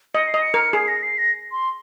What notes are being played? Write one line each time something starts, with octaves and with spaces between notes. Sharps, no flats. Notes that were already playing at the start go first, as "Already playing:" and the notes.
D#5 C#7
C7
D#5
C#7
A#4
G#4 C7
A#6
C7
A#6
C6